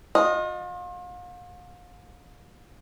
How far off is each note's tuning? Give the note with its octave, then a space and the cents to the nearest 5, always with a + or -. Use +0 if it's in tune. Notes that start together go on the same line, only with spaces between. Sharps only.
F4 +40 D#5 -5